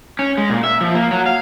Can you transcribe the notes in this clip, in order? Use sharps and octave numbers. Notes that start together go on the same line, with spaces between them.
C#4
G#3
A#2
E5
F3
A#3
F#3
F5